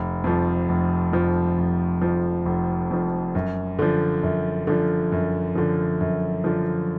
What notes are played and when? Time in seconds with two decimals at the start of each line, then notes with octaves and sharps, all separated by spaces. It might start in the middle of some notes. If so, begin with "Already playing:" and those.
Already playing: F1
0.24 F2 F3
0.69 F1
1.12 F2 F3
1.58 F1
2.01 F2 F3
2.46 F1
2.91 F2 F3
3.35 F#2
3.79 D3 F3
4.23 F#2
4.67 D3 F3
5.12 F#2
5.55 D3 F3
6.01 F#2
6.44 D3 F3